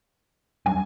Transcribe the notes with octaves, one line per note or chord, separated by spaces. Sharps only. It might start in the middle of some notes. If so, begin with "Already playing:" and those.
F#3 G3 D4 G#5